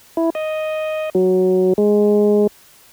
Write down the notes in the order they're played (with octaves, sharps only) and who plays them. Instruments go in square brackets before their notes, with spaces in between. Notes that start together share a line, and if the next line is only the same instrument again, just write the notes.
[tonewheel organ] E4
D#5
F#3
G#3